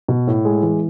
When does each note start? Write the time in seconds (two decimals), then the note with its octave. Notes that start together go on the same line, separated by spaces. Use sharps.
0.08 B2
0.27 A2
0.45 G#3
0.63 E3